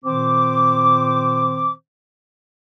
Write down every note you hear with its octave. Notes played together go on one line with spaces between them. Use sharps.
A#2 D#3 C4 C5 D6